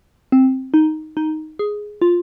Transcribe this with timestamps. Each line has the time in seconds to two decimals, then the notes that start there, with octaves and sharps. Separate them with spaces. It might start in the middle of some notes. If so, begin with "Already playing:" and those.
0.32 C4
0.74 D#4
1.17 D#4
1.59 G#4
2.02 F4